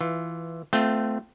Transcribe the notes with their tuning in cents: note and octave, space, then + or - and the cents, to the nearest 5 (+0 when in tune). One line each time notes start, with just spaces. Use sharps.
E3 +10 F4 +0
A3 +0 C4 -25 F4 +0